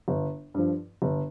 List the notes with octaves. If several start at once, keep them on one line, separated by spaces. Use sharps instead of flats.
G1
G2 F3
G1